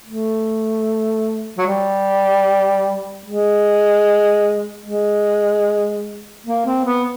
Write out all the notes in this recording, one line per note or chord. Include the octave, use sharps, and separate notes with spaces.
A3
F#3
G3
G#3
G#3
A#3
C4
B3